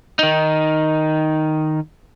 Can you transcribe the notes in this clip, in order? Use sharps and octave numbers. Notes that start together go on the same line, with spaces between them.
D#3 D#4